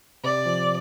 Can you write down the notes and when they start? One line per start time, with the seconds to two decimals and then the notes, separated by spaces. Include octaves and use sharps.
0.24 C3 D5
0.46 F3